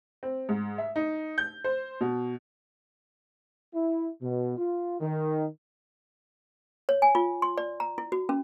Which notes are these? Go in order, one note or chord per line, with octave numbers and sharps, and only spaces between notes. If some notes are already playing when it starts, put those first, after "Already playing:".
C4
G#2
E5
D#4
G6
C5
B2
E4
B2
F4
D#3
C#5
G#5
F4
C6
D5
A#5
E4
F#4
C#4